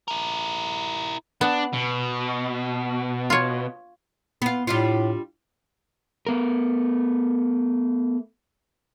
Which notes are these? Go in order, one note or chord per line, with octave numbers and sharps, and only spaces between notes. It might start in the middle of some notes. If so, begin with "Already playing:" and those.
E4 A#4
B3 D4
B2
F4 C#5
B3 F4
A2 G3 D4 F4
A3 B3 A#4